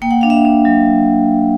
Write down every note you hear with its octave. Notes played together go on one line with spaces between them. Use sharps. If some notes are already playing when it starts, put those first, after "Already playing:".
A#3 G5
F#5
D4 F5
E5 F#5
D4
F#3